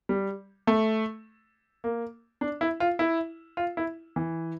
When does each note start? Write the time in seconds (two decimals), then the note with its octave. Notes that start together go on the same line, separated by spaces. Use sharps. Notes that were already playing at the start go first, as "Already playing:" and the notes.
0.09 G3
0.67 A3
1.84 A#3
2.41 D4
2.61 E4
2.80 F4
2.99 E4
3.57 F4
3.77 E4
4.16 E3